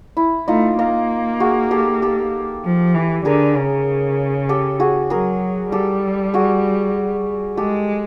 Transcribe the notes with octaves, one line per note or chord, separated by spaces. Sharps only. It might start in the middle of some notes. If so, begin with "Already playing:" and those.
E4
A3 D#4 F4
A#3 D#4 F4
F#4 G#4
G4 A4
G4 A4
F3
E3
D3 G#4 A#4
C#3
G4 A4
F#4 G#4
F#3 G#4 A#4
G3 G4 A4
F#4 G#4
G#3 G4 A4